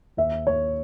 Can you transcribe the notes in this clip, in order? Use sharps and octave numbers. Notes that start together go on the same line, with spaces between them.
D#2 E5
D#2 C#5